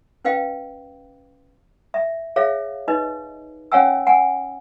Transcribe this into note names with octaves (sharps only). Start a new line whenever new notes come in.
C#4 B4 D#5 F5 G5
E5
G#4 C#5 E5 F5
D#4 B4 D#5
C#4 C#5 F5 F#5 G#5 E6
F#5 G#5